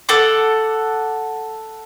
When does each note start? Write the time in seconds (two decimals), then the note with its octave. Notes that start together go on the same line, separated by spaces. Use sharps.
0.09 A4 F#5 D6